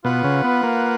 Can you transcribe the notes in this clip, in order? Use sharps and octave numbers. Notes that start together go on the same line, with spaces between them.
B2 F4 B4 F#5
C#3
B3
A#3